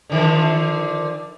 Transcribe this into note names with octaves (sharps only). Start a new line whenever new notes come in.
D3 D#3 F3